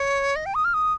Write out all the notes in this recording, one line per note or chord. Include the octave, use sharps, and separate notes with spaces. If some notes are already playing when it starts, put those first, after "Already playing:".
Already playing: C#5
D#5
G5
D#6
F6
D#6